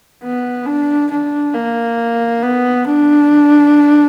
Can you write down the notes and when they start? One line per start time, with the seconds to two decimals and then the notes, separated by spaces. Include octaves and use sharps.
0.23 B3
0.66 D4
1.11 D4
1.54 A#3
2.42 B3
2.85 D4